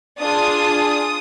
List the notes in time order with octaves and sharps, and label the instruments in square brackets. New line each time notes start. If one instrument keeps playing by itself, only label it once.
[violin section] D4 F4 G#4 D#6